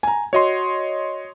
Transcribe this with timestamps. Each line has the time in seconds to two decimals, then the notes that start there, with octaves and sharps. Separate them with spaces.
0.03 G#5 A#5
0.33 F#4 C#5 D#5 C6